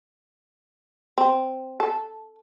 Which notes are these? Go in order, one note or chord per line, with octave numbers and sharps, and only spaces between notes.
C4
A4